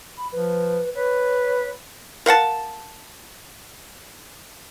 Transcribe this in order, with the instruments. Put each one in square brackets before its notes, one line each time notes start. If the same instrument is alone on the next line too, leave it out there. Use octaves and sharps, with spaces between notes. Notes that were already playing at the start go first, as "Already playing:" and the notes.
[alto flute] B5
[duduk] F3 [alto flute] B4
[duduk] B4 [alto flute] C#5
[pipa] A#4 F5 F#5 A5